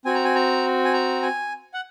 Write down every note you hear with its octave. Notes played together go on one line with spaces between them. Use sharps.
C4 F#4 G#5
A#5
G#5
A#5
G#5
A#5
G#5
F#5